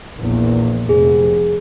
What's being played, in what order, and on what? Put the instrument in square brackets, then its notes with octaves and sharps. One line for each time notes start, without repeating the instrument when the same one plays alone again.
[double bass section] A#1 E2 A#2
[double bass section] F1 [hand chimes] G#4